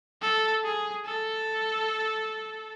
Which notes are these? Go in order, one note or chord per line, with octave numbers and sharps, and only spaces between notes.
A4
G#4
A4